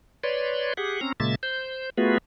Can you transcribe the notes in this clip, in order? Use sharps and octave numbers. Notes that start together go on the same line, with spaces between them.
B4 C#5 D5 C6
G4 G#4 F#5
C4 C#4 A#5
A#2 C#3 G#3 A#3 E5 A6
C5 G6
A3 B3 F4 F#4 G#4 B4